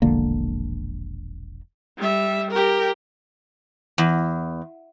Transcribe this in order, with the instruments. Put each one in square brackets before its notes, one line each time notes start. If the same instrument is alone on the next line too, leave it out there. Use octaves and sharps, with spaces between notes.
[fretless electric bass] E1 A#1 D3 A#3
[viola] G3 E5
G4 A#4
[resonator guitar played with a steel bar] E2